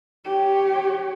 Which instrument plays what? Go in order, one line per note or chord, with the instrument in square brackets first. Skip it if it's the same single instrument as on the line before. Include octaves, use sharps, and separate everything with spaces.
[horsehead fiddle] G4 C#5